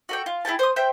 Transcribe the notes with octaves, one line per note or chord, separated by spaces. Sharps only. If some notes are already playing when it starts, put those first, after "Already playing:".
F#4 A4 G5
F4
E4 G#4 G5 A5
C5 D#6
C5 E5 G5 G6